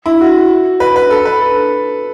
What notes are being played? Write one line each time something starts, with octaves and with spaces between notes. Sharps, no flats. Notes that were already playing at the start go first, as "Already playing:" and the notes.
E4
F#4
B4
B4
A4
B4
A4